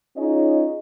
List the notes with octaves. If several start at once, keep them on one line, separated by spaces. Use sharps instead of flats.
C#4 D#4 F4 G#4 C#5 D#5